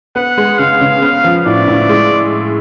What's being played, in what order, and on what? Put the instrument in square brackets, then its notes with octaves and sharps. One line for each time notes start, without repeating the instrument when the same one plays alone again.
[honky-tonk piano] B3 [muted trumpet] F#5
[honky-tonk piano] G#3
[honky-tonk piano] C#3 [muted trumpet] F5
[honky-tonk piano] C#3
B3
F3
[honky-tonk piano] A2 [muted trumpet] D5
[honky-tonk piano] A2
G#3